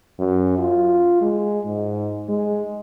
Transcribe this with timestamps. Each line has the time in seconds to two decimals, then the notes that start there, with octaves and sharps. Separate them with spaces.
0.19 F#2
0.59 F4
1.21 G#3
1.65 G#2
2.29 G#3